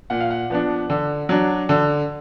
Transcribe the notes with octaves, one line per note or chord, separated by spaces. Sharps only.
A#2 F#5
F5
F#5
F3 B3 D4
D3
F#3 D4
D3